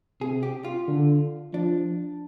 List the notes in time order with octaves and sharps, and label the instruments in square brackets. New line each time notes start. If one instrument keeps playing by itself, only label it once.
[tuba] C3 [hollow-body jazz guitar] G#4
[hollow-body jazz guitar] G4
F4
[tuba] D3
[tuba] F3 [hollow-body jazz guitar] D4